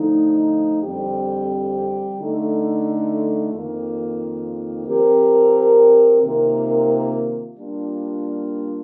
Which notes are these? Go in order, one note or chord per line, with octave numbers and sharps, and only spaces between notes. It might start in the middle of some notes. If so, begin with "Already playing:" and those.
Already playing: D3 F3 A3 D#4
F2 D3 G3 C4 G4
D3 A3 D#4
F2 D#3 A#3 F4
F3 C4 G4 A#4
C3 D#3 A#3 F4 A#4
G3 A#3 D4 F4